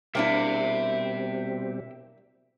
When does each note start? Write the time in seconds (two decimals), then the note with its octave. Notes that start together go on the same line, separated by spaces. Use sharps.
0.15 B2 G3 A#3 C4 D4 E4 E5 G5